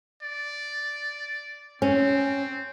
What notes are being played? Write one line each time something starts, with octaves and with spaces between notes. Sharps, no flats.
D5
C4 C#4